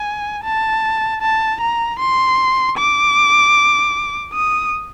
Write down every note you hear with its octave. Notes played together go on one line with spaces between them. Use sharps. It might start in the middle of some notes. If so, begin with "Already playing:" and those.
Already playing: G#5
A5
A5
A#5
C6
D6
D#6